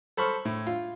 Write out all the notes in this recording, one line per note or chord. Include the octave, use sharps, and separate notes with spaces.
A4 C5 B5 C#6 F6
A2
F4